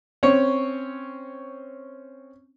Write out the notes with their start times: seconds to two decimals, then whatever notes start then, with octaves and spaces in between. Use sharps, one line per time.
0.23 C4 C#4 C#5